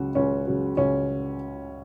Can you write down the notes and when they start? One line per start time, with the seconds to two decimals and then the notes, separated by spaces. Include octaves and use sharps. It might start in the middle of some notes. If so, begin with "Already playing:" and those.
Already playing: C#2 C#3 F#3 F#4
0.15 C#2 C#4
0.47 C#3 F#3
0.77 C#2 C#4